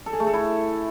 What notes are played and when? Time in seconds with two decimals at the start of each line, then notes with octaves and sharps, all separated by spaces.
0.06 A4
0.13 G#4
0.20 A3
0.27 A4
0.34 E4